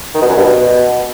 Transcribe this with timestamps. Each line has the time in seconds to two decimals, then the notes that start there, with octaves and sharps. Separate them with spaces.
0.15 D#3
0.22 B2
0.29 F#2
0.37 G2
0.44 B2